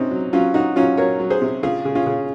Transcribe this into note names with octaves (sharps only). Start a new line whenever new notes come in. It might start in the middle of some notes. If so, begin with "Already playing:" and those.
Already playing: C3 C4 C#4 D#4
F#3
F#3 C#4 F4
F#3 D#4 F#4
F#3 C#4 F4
F#3 A#4 C#5
F#3
G#4 C5
C3
C#3 F4 G#4
C#3
C#4 F4
C#3